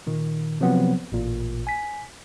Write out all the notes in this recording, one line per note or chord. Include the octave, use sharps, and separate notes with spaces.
A#2 D#3
C3 F3 F#3 B3 C4
A1 A#2
G#5 B6